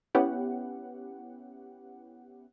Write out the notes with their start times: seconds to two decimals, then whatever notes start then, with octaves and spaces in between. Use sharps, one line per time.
0.15 B3 C#4 E4 G4 F#5